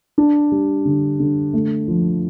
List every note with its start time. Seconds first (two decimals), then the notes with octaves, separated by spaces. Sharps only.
0.18 D4
0.51 G3
0.85 D3
1.20 D3
1.53 A3
1.88 F3